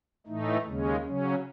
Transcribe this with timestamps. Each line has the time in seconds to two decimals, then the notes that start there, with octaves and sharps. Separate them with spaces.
0.27 A2 E3 A3 D#4
0.66 D#2 C#3 G#3 C#4
1.04 C#3 F#3 C#4